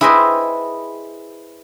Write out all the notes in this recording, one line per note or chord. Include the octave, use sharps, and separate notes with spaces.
E4 G#4 B4 C5 D#5 G5